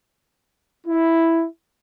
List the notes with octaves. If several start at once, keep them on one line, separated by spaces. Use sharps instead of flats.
E4